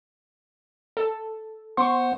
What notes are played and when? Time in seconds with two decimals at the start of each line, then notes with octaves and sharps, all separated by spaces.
0.97 A4
1.77 B3 C5 F#5 C6 C#6